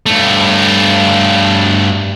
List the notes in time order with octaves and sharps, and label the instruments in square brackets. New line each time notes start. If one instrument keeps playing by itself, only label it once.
[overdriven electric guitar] G2 A3